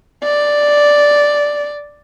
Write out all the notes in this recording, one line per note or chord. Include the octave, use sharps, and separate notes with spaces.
D5